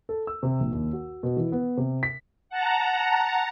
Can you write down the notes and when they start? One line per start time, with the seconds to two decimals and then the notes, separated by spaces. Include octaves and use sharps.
0.09 A4
0.27 E6
0.43 C3
0.60 A#1
0.72 D#2
0.93 F#4
1.23 B2
1.37 E3
1.52 B3
1.77 C3
2.03 B6
2.49 F#5 A5 A#5